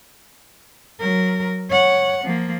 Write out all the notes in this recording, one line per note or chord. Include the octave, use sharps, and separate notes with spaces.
F#3 A#4
C#5 F#5
F3 A#3